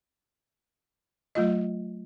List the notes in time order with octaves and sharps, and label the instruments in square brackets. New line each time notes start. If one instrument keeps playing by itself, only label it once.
[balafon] F#3 A3 F4 D#5